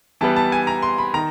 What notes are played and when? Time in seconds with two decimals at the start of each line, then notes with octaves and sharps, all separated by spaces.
0.21 E3 G3 B3 A5
0.36 A5
0.52 G#5
0.67 A#5
0.82 C6
0.98 B5
1.14 D#3 A#5